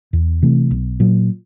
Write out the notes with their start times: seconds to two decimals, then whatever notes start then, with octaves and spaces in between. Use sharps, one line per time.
0.13 E2
0.42 C3 E3 A3
0.71 B1
1.00 A#2 F#3